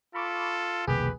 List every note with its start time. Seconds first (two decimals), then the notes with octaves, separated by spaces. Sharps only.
0.15 F4 A4 B5 C#6 D6
0.87 F1 C2 B2 D#3 A#3 G4 G#4 B4